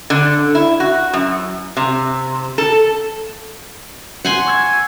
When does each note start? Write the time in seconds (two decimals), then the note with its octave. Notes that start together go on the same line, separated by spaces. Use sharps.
0.10 D3
0.55 E4
0.80 F#4
1.13 F#2
1.77 C3
2.58 A4
4.25 F#5 G#5 C6
4.46 C#6 E6 G#6